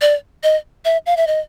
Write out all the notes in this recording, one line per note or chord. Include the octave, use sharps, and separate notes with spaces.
D5
D#5
E5
F5
E5
D#5